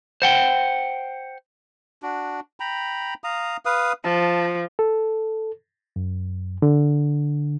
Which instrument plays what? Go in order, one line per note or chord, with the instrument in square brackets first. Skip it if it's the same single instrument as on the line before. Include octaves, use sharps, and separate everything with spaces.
[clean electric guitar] C5 F#5 G5
[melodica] D4 F#4
G5 A#5 B5
F5 A#5 D#6
B4 F5 D#6
[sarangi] F3 [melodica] A5
[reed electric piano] A4
F#2
D3